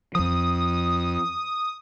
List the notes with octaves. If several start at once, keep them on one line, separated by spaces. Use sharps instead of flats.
F2 F3 D#6